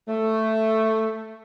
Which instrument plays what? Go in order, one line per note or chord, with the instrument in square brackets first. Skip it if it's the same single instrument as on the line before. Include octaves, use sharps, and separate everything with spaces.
[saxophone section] A3